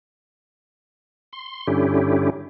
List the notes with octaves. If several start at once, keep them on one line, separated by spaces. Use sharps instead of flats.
C6
G2 D3 C#4 E4 G4